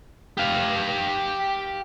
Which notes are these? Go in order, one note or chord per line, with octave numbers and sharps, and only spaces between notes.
G4 F5